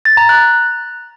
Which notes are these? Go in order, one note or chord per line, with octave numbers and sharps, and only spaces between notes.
A6
A#5
F#6